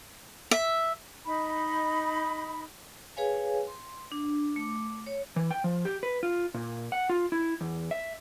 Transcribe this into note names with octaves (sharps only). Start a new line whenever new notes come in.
E5
D#4 B5
G#4 B4 C#5 F5 G#5
C6
D4
A3 D6
C#5
E3
G5
F3
G4
B4
F4
A#2
F#5
F4
E4
E2
E5